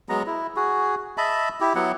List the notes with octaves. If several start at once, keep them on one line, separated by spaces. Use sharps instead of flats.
F#3 G#3 B3 A#5
E4
F#4 G#4
D#5 E5 A5 B5
E4 G4
F#3 B3 E4 F#5